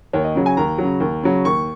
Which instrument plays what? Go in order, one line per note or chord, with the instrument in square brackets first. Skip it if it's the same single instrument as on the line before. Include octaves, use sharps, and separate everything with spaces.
[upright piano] D#2 C#5
D#5
C#3 F#3
G#5
D#2 A#5
C#3 F#3
D#2
C#3 F#3
D#2 C#6